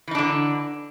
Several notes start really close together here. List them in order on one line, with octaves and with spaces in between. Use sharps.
E3 D#4 D4 D3